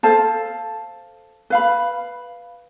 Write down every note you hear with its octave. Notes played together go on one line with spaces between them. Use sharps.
A4 C5 F5 A5
B4 F5 B5